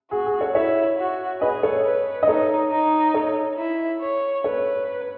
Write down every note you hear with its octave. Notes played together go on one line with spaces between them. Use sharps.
F#4 G#4
G#4
A4 C#5
E4 C#5 E5
F#4
G#4 B4 D#5
A4 C#5
B4
D#5
D#4 A4 C#5
D#4
A4 C#5
E4
C#5
A4 B4 C#5